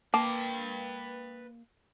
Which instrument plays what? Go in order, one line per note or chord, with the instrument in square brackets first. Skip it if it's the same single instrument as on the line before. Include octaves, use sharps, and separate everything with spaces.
[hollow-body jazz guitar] A#3 [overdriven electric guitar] B4 G5 [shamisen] A5 [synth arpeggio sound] D6